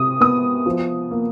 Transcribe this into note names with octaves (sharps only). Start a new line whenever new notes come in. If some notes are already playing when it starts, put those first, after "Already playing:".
Already playing: C3 D#6
B3 D#6
F3
A#3